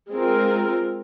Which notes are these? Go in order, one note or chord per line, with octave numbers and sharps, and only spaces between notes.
G#3 C4 F4 A#4